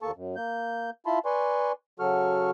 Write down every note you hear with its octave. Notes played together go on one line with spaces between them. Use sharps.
D#2 A#3 A4 A5 C#6
F#2
A#3 G6
E4 F4 A5 B5 C6
B4 D5 G#5 C6 C#6
C#3 F#3 F#4 A4 C#6 F6